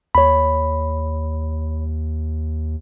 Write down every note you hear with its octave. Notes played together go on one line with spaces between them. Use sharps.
D#2 C#5 B5